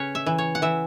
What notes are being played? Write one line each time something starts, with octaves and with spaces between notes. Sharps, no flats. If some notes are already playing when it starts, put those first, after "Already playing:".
Already playing: C#3 C#4 B4 C#5
E5
E3
C#5
F#5
E3 E5